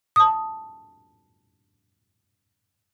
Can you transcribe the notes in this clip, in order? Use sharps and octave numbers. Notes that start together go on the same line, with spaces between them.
A5 D#6